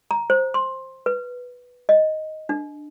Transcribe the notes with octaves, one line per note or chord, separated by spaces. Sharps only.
A#5
C5
C6
B4
D#5
D4